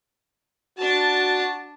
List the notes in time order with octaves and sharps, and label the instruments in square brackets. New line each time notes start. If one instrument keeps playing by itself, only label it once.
[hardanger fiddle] D4 A5 [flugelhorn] F#4